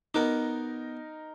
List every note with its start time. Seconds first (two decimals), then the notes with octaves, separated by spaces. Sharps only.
0.14 B3 D#4 F#4 A#4 D6